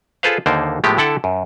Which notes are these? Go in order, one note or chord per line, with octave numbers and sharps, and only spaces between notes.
F4 G#4 A4 B4 C5 F5
D#2 D3 A#3 D#4 C5 D5
A2 F3 G#3 A3 B3 G4
D3 E4 A4 F#5 G5 A5
F#2